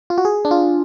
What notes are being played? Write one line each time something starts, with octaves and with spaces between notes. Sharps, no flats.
F4
F#4
G#4
D4
F4